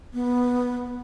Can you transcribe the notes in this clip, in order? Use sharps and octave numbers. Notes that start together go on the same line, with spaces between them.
B3